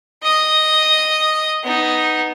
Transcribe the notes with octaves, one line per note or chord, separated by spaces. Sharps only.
D#5 D#6
B3 D#4